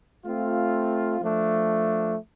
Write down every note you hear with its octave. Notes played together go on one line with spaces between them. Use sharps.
A3 C4 F4
F3 A3 D4